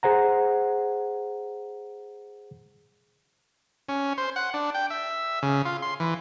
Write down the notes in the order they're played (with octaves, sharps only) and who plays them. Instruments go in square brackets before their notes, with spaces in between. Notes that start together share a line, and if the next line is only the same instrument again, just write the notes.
[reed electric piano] G#4 C5 F#5 A#5
[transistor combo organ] C#4
C5
F#5
D4
G5
E5
C#3
F4
C6
E3